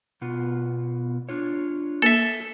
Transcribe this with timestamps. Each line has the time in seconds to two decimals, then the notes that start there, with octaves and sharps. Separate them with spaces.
0.21 B2 B3 F4
1.29 D4 F4 C#5
2.02 A#3 A4 E5